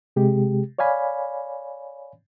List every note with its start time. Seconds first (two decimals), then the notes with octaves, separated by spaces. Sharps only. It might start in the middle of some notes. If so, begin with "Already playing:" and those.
0.16 C3 G#3 G4
0.79 C#5 D5 F5 G#5 B5